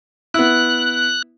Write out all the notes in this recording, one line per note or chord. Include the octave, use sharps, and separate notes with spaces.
B3 E4 F#6